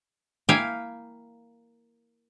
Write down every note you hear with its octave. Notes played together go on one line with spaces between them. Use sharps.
A#3 E4 E5 F5 G5 G#5